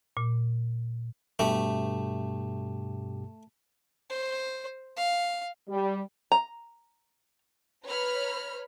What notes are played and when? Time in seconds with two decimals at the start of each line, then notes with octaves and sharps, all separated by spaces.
0.17 A#2
1.39 G2 B2 A3 G4
4.10 C5
4.97 F5
5.69 G3
6.32 A#5
7.86 B4 C#5 A#5 B5 F6